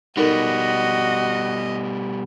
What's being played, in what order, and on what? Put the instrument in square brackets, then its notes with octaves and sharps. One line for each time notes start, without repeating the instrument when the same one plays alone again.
[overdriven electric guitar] B2 G3 [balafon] D#4 A4 A#4 [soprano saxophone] F#4 [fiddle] D#5